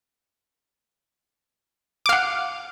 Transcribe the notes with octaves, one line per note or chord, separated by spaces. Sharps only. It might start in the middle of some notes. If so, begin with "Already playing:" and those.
F5 F#5 D6